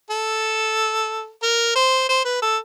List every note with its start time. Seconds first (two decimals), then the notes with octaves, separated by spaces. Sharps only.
0.10 A4
1.43 A#4
1.75 C5
2.09 C5
2.25 B4
2.42 A4